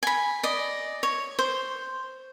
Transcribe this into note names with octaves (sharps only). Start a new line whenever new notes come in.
G#5 B5
D5 D#5
C#5
C5